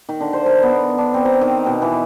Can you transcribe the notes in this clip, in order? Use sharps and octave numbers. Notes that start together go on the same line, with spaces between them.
D#3
D3
C5
A#4
B3
D4
C4
A#5
D#3
B2
E3